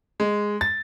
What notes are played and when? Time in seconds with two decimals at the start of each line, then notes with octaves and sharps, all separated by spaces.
0.20 G#3
0.61 A6